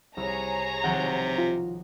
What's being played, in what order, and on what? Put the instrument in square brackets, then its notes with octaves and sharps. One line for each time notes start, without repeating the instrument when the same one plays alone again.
[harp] C2 E6 C#7 [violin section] G#4 C#5 A#5
[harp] B1 D#3 F3 [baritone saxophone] C3 [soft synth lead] F#5
[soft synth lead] F4